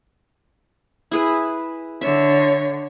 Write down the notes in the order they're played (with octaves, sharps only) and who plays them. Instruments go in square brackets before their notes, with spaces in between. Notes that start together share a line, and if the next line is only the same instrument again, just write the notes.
[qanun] E4 G#4 B4
[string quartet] D3 C#5 [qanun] E5